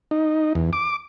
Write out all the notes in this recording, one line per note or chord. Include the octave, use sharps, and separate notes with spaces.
D#4
E2
D6